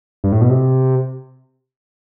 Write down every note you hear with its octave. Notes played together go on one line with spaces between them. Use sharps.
G2
A2
B2
C3